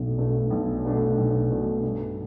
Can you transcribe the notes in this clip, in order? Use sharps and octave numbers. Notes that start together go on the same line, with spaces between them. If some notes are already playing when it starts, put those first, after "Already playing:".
Already playing: B1 B2 A3 D4
B2 A3 D4
B1
B2 A3 D4
B1
B2 A3 D4
G2